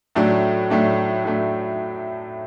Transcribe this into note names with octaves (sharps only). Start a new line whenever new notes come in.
A2 F#3 A3 D4
A2 F#3 A3 D4
A2 F#3 A3 D4